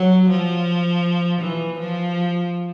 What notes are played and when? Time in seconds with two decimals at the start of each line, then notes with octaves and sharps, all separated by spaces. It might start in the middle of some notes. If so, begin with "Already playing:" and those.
Already playing: F#3
0.30 F3
1.42 E3
1.80 F3